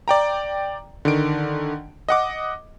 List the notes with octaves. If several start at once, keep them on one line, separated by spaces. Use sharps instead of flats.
D5 G5 A#5
D3 D#3 D7
D#5 F#5 D6